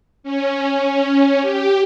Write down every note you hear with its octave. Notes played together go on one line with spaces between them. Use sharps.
C#4
G4